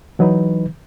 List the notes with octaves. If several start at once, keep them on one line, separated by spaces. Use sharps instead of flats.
E3 F#3 D#4 B4